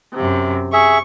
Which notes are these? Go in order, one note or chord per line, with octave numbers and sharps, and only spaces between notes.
F#2 C3
G#4 E5 C#6